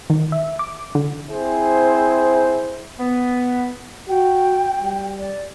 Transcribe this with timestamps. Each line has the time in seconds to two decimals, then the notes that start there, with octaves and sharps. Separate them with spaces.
0.10 D#3
0.32 E5
0.59 D6
0.95 D3
1.28 C4 E4 G#4 C5
3.00 B3
4.09 F#4 G5
4.81 G3
5.19 D5